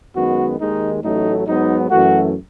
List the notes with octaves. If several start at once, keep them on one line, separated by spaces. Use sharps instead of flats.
F#2 D#3 G#3 B3 F#4
D#2 D#3 G#3 D#4
A1 A2 F#3 A3 D#4
G#2 F#3 B3 D#4
F#2 E3 A3 F#4